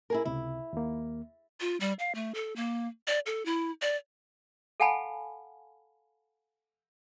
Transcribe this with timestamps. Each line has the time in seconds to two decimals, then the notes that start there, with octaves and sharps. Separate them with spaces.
0.10 E4 G#4 A#4
0.25 C#2 C3 E4
0.73 D#2 A#3
1.60 F4
1.80 G3
1.99 F5
2.15 A3
2.34 A4
2.56 A#3
3.07 D5
3.26 A4
3.45 E4
3.82 D5
4.80 A4 F5 F#5 G#5 A5 B5